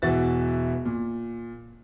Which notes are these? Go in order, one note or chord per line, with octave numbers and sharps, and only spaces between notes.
E1 E3 F#4 E5 A6
A#2